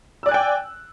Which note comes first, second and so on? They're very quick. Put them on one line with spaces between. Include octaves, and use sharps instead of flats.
E6 D5 F#6 G#5 G5